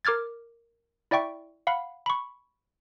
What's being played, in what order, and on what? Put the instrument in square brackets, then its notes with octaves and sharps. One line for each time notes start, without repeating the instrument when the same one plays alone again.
[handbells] A#4 D6 F6 G#6 A6
E4 D5 E5 G5 C#6
F5 F#5 B5
B5 C#6